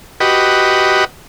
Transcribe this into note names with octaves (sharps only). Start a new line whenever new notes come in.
F#4 G4 B4 D#5